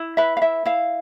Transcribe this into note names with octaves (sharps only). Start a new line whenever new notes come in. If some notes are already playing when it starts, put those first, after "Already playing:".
Already playing: E4
B4 E5
F5
E4 E5
E4 F5